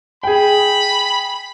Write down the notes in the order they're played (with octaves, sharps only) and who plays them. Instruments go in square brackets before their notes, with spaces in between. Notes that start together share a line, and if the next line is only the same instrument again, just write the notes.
[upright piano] G#4 G5 [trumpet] B5